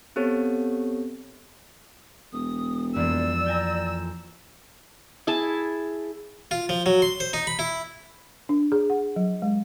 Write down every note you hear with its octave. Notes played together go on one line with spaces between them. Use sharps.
B3 C4 G4 A4 C#5
E1 D#6
F2 E3 A#3 D5 E6
G5 G#5 A#5
E4 G#4 A5
F4
F3
F#3
C6
C5
D#4
B5
E4
D4
G#4
F#5
F#3
G#3